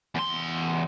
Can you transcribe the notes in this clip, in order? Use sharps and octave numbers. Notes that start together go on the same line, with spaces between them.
E2 C6